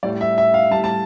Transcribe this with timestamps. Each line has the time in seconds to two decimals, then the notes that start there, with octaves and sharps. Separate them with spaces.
0.03 A2 G3 D5
0.21 E5
0.38 E5
0.54 F5
0.71 G3 A5
0.75 A2
0.84 A5